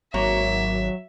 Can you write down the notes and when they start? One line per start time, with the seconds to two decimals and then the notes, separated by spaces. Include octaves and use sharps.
0.14 G#1 F#3 A#3 C#5 E5